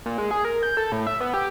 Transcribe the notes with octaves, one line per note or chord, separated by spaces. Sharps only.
A#2
G#3
G#4
A#4
G6
A4
A2
E5
B3
G4